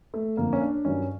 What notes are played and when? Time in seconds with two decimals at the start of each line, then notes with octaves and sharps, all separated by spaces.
0.14 A3
0.37 F2 D3 F3 A#3
0.53 C#4
0.61 D4
0.85 G2 D#3 F#3 C#4